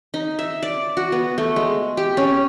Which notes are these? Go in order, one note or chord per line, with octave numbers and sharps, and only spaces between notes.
D#4
E5
D5
F#4
B3
A3
G#3
G4
C#4